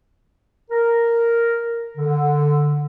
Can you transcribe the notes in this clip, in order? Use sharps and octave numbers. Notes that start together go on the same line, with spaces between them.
A#4
D3